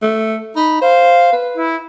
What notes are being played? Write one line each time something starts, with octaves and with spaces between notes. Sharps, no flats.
A3
D#4 B5
C5 F5
B4
E4